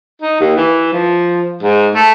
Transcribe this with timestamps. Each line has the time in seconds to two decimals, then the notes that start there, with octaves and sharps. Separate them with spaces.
0.22 D#4
0.40 D#2
0.57 E3
0.92 F3
1.63 G#2
1.95 A3